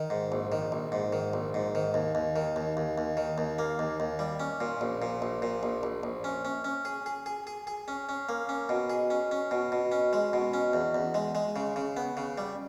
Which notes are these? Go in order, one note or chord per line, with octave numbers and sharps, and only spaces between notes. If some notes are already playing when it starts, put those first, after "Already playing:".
Already playing: D#3
G#2
A#1
D#3
A#1
G#2
D#3
A#1
G#2
D#3
D#2
D#2
D#3
D#2
D#2
D#2
D#3
D#2
A#3
D#2
D#2
G3
C#4
A#2
A#1
A#2
A#1
A#2
A#1
A#1
A#1
C#4
C#4
C#4
G#4
G#4
G#4
G#4
G#4
C#4
C#4
A#3
C#4
B2
G#4
C#4
C#4
B2
B2
C#4
G#3
B2
C#4
E2
E2
G#3
G#3
C#3
C#3
B3
C#3
G3